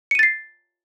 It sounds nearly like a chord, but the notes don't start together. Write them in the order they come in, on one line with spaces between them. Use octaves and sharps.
C#7 D#7 A6 C7